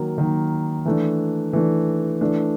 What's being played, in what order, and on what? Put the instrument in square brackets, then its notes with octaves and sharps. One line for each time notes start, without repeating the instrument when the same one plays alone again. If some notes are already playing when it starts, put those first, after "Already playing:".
Already playing: [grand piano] D#3 F#3 A#3
D#3 F#3 A#3
E3 A3 D4
E3 A3 D4
E3 A3 D4